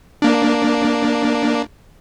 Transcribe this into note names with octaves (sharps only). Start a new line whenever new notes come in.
A#3 D4